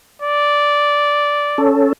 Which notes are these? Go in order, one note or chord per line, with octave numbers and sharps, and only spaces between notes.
D5
C#4 A4